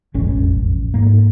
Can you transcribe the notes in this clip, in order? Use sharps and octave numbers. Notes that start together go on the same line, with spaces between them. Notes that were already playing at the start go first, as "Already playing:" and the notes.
E1 A1 F2 C#4
G#2 A#3